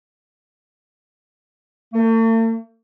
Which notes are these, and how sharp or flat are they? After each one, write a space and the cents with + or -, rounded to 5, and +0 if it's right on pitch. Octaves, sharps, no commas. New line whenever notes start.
A3 +45